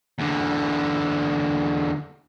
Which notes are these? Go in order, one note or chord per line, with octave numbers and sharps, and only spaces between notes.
E2 D3